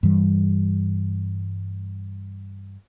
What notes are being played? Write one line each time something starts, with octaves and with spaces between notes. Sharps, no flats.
G2 E3 G3